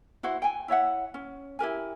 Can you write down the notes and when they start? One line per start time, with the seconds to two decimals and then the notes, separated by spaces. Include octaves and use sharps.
0.23 E4 F#4 C5 F#5
0.42 G5 G#5
0.68 E4 C#5 E5 F#5
1.14 C#4
1.59 E4 G4 A#4 G#5